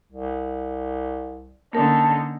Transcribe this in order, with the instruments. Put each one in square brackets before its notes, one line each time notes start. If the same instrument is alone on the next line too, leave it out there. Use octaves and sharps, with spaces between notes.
[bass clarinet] C2
[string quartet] D3 C#4 D#4 [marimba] A#3 A#4 [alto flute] A5